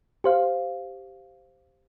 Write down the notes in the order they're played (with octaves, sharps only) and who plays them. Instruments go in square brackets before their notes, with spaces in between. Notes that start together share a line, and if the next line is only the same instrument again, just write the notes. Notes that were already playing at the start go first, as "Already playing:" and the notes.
[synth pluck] G4 C5 F5